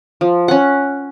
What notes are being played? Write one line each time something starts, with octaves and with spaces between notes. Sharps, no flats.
F3
C#4 F#5